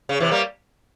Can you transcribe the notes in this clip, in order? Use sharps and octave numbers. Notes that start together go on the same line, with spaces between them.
C#3
C3 E3
G3 A#3